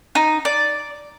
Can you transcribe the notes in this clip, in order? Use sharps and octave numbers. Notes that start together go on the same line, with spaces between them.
D#4
D5